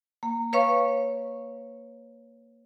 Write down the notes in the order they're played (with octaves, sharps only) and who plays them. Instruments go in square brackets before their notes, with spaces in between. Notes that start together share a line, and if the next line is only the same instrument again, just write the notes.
[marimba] A#3
B4 C#5 F5 C#6